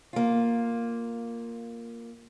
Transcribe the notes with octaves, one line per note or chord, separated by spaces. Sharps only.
A#3 F4